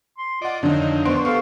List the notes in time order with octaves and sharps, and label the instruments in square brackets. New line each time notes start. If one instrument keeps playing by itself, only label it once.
[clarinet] C6
[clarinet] F4 [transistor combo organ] D5 [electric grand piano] D#5 F#5
[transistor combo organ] F2 D#3 [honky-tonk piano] D3 [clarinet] F#3 [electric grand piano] D4 D#4
[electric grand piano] B3 D4 D7 [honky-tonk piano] C5 C#6
[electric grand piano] B3 G4 A4 [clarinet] F5 [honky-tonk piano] C#6